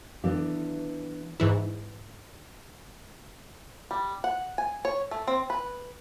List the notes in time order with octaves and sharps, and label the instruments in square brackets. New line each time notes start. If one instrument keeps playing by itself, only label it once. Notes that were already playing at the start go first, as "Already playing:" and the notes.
[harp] E3 [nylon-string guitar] B3 D4 G4
[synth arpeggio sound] G#2 E3 E4
[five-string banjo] G3
F#5
G#5
C#5
A3
C4
B4